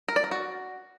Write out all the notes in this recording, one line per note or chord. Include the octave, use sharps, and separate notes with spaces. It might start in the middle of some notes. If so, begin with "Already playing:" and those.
A#4
D5
A#4
F#4